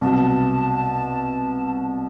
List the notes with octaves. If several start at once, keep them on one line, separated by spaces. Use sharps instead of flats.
C2 B2 F#3 A5